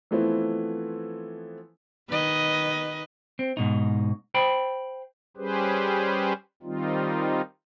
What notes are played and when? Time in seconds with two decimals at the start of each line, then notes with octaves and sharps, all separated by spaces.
0.11 E3 F3 A3 B3 C4 E4
2.09 D#3 B4 D#5
3.39 C4
3.57 G#2 B2 D#4
4.34 C5 G5 B5
5.37 G3 C#4 G4 G#4 B4 C5
6.63 D#3 G3 C4 D#4 F4